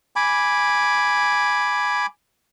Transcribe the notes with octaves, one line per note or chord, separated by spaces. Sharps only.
G#5 B5 D6